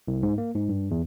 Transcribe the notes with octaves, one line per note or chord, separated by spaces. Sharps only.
C2
G#2
A#3
G#2
G2
E2